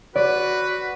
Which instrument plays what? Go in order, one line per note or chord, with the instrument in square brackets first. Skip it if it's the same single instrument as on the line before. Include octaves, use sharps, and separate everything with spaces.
[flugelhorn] F#4 [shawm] B4 [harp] D5